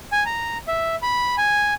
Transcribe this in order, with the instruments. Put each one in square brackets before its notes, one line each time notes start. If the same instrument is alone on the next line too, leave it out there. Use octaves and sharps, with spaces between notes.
[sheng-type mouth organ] G#5
A#5
E5
B5
G#5